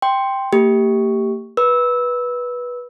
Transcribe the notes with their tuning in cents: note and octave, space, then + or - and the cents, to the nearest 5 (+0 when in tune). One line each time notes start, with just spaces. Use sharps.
G5 +0 C6 +0
A#3 -40 G4 +0
B4 -15 E6 -15